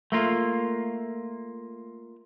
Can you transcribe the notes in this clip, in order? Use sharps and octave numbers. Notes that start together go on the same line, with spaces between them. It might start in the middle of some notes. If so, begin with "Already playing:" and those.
A3 A#3 F4